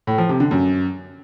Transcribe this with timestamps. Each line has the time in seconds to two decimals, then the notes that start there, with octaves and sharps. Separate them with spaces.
0.07 A2
0.18 F3
0.29 C3
0.40 D3
0.51 F#2